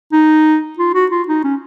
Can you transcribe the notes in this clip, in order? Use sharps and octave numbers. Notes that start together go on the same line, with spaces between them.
D#4
F4
F#4
F4
D#4
C#4